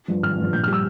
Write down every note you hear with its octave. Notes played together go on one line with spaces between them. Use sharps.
G2 F3
G#1 F6
G2 F3
A#1 G6
F6
G3
E6